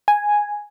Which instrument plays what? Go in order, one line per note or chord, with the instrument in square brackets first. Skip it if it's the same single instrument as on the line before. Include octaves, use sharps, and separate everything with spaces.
[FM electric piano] G#5